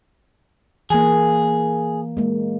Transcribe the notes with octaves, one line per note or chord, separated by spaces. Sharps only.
E3 A#3 G#4
G#3 A#3